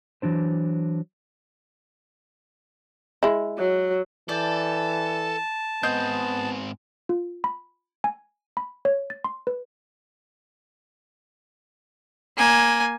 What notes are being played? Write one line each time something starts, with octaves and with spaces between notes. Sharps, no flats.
E3 F#3 D4 C5
G#3 E4
F#3
E3 A4 D5 G5 A5
G#2 B3 C4 D#5 C6 G6
F4
B5
G#5
B5
C#5
A6
C6
B4
A#3 G#5